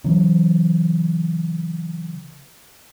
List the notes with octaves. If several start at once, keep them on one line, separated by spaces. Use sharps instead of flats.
C#3 E3 F#3